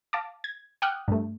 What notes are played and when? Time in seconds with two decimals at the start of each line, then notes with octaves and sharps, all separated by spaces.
0.13 F5 A5 D6
0.44 G#6
0.82 F#5 G5 D6 D#6 F6 F#6
1.08 G2 A3